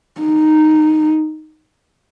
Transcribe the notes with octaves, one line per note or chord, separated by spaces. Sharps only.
D#4